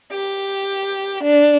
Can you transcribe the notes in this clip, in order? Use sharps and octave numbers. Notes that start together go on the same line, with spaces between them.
G4
D4